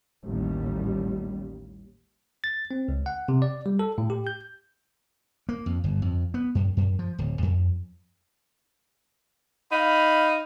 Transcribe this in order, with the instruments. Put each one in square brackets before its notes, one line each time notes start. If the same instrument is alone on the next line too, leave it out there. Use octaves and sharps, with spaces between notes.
[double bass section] A1 D#2 G3
[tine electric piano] A6
C4
C#2
F#5
C3
D5
G3
A4
A2
G4
G6
[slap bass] A#3
F2
G1
F2
B3
F#2
F#2
F3
D1
F2
[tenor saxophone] D#4 [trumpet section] F5 B5